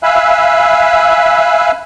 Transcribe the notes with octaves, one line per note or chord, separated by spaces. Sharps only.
E5 F5 G#5 B5 E6 F#6